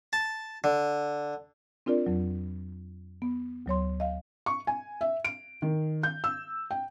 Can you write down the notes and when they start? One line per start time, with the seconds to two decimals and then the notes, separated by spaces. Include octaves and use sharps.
0.13 A5
0.64 D3
1.86 C4 D4 F4 A#4 D5
2.06 F2 F#3
3.22 B3
3.66 D2 F#3 C#5 C6
4.00 D#5 F5
4.46 C#6
4.67 G#5
5.01 E5
5.25 D7
5.62 D#3
6.03 G6
6.24 E6
6.71 G5